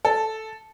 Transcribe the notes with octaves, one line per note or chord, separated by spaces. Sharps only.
A4